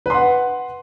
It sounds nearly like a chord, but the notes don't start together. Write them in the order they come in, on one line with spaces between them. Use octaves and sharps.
B4 C6 F#5